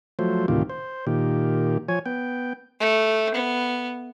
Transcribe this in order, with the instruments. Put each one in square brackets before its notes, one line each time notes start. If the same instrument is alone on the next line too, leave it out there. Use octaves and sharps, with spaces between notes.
[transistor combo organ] F3 F#3 A3 C5
D2 A2 C3 D#3 F4 G4
C5
A#2 D#3 G4
F3 C#5 G#5
B3 G5
[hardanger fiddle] A3
B3